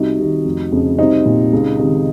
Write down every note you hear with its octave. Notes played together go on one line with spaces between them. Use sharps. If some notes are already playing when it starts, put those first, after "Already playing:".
Already playing: C2 D#4 F#4
C3 D#3
F1
F2 C#3
C2 C4 D#4
A#2
C#2
C3 D#3